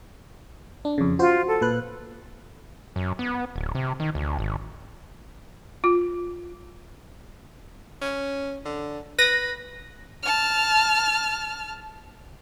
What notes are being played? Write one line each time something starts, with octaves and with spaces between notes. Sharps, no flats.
D4
F2 C#3
F4 F#4 C5
A4
A#2 B4 F#6
F#2
B3
D1
C3
D#3
D2
G#1
F4
C#4
D3
B4 A#6
A5 F6